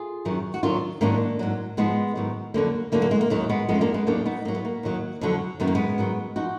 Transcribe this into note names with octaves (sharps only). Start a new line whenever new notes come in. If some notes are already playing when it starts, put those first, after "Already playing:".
Already playing: F4 G#4
F#2 D#3 F#3
F#4
D#2 D#3 F#3 D4 F4
G#2 D#3 F#3 A#3 D4
G#2 F#3
G#2 F3 G#3 B3
G#2 D#3 F#3
F2 D3 F#3 A#3
D2 D3 F#3 A#3
A#3
G#3
A#3
D#2 D#3 F#3
G#3 B3
F#2 F3 G#3 B3
A#3 D4
G#3 B3
D#2 D#3 F#3 A#3 D4
B3 D#4
G#2 F#3 A#3
B3
A#3
D#2 D#3 F#3
F2 D3 F#3
F#2 D#3 F#3 B3
A#3
G#3 B3
G#2 D#3 F#3
F3 D#4 F#4